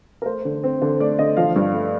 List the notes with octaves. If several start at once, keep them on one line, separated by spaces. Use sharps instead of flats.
A#4
A3 C5
D3
C4
D3 C5
A3 D5
D3 D#5
F3 F5
G2
A3